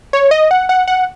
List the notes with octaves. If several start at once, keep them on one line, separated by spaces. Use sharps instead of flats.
C#5
D#5
F#5
F#5
F#5